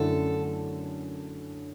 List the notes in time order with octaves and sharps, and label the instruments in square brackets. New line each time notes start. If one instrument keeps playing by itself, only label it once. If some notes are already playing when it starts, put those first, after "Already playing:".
Already playing: [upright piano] F#2 D3 A3 E4 [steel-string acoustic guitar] A4